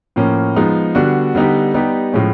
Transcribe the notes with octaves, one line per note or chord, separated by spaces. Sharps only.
A2 F3 A#3 C#4
F3 G#3 B3 D#4
D3 G3 B3 D4 F#4
D3 G3 B3 D#4 G4
G3 B3 D#4 G4
A2 F3 G#3 C#4